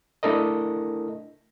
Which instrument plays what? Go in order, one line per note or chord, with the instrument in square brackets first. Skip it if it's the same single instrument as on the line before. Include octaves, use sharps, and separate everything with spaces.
[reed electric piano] A3 D4 E4 A4 A#4 D#5